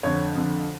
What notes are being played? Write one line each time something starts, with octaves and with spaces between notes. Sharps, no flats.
F2 D3 C#5
F2 D3